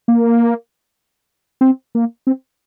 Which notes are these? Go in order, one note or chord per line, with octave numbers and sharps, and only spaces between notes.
A#3
C4
A#3
C4